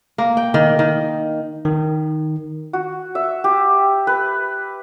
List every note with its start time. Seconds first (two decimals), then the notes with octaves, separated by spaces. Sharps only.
0.18 A#3
0.37 G5
0.54 D#3
0.79 D#3
1.65 D#3
2.73 F#4
3.15 E5
3.44 G4
4.07 B4